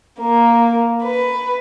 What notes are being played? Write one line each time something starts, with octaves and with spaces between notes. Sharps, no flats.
A#3
B4